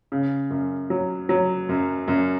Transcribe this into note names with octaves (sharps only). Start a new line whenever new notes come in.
C#3
F#2
F#3
F#3
F#2
F#2